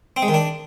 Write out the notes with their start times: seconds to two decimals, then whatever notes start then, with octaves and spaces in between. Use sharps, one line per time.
0.17 C4
0.22 G#3
0.28 D#3
0.34 D4